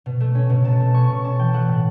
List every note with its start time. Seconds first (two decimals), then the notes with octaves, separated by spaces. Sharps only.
0.06 B2
0.20 A3
0.35 C#4
0.50 B2
0.65 B2 A5
0.80 A3
0.94 C#4 C#6
1.04 C#6
1.09 B2
1.15 C#6
1.24 C#4 A5
1.39 E3 G5
1.53 A3 F#5
1.69 A2